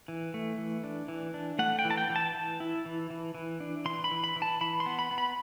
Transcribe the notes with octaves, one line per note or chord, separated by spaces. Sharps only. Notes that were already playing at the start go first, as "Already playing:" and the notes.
E3
A3
E3
D4
E3
D4
A3 F#5
G5
E3
A5
G5
E3
A5
E3
E4
E3
E3
E3
D4
E3 C6
B5
E3
B5
E3
A5
E3 B5
C6
B3
B5
B3
B5